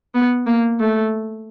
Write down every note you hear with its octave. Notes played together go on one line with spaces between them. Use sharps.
B3
A#3
A3